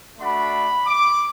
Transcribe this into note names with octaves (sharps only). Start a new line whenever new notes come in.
A3 D4 F#4 B5
D6